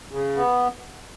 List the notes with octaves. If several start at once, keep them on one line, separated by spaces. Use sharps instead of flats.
C#3
B3